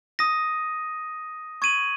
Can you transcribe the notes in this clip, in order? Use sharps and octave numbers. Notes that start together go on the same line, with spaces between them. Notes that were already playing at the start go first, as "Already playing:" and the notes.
D#6 A#6 D#7
C#6 G#6 D#7 F#7